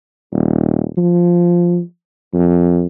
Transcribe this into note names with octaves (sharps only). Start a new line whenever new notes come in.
D#1
F3
F2